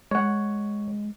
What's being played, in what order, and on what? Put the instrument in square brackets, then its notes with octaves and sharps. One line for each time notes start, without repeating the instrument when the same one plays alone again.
[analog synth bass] G#3 [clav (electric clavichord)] C#5 F#5